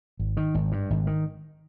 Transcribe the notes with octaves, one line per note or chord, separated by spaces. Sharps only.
G#1
D#3
G#1
G2
G#1
D#3